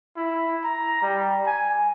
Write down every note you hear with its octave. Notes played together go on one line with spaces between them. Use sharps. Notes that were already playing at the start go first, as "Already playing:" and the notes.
E4
A#5
G3
G#5